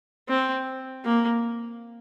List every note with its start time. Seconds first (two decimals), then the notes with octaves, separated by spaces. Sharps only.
0.29 C4
1.04 A#3